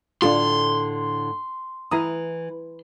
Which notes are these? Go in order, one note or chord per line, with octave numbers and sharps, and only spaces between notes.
A2 D3 D4 F4 A4 C6
E3 E4 A#5 D#6